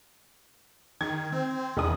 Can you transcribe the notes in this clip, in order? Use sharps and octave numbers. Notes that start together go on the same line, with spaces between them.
D#3 G#6
C4
F1 E2 D4 D#6